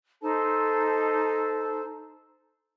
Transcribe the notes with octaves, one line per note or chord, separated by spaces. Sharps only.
D#4 A4 C5 A5